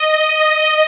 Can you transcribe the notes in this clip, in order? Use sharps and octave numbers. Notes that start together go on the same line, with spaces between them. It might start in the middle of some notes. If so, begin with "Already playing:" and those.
Already playing: D#5